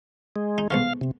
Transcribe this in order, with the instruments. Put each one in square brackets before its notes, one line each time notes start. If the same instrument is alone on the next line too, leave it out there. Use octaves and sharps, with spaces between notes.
[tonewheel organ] G#3
[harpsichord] D#4
[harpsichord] B1 G#2 D3 [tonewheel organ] F5
[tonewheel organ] C3